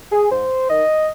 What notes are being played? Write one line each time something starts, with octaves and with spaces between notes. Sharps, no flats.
G#4
G#2 C5
D#3 D#5